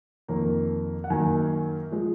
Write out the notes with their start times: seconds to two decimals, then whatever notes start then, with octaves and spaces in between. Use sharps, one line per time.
0.28 F2 D#3 A#3
1.04 F#5
1.10 F#2 D#3 A#3 G#5
1.91 F3 G#3